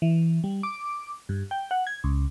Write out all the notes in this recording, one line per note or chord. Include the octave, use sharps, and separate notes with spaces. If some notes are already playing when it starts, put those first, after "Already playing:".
E3
G3
D6
G2
G5
F#5
G#6
C#2